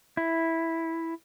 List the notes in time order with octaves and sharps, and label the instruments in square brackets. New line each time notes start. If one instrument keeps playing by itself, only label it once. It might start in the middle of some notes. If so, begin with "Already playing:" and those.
[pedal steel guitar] E4